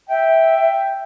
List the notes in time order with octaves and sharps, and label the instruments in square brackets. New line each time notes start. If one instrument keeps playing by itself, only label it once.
[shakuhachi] E5 [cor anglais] G5